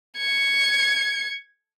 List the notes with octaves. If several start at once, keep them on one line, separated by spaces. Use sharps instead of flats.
G#6 C#7